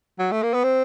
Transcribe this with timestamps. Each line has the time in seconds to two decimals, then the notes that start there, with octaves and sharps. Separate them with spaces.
0.19 F#3
0.32 A3
0.43 A#3
0.54 B3
0.64 C4